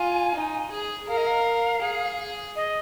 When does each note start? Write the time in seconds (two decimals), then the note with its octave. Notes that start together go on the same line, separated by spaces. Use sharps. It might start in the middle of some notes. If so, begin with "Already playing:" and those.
Already playing: F4 G#5
0.35 D#4
0.71 G#4
1.08 A#4 F5
1.17 D#5
1.27 F5
1.82 G#4
2.56 D#5